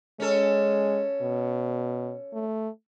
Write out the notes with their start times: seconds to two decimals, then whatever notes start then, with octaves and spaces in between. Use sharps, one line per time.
0.20 G#3 C#4 A4
1.21 B2
2.33 A3